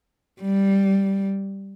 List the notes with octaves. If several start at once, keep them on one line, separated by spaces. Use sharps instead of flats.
G3